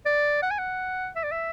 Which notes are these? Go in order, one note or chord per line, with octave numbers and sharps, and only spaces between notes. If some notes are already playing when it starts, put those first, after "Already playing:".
D5
F#5
G#5
F#5
E5
D5
E5